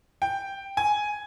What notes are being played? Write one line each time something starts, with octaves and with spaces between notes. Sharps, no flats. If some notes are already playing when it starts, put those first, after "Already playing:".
G5
G#5